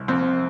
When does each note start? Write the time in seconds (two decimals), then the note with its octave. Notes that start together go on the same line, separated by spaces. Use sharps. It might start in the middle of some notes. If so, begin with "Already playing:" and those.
Already playing: C2
0.08 F2 C4